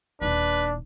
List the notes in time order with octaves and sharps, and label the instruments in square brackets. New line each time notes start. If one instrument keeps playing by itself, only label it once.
[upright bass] D#1 D#4 [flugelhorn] D4 [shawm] B4